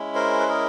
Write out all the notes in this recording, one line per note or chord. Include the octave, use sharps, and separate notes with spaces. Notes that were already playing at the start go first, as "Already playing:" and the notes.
Already playing: G#3 C#4 E4
A#4 C5
B4
G#4 A#4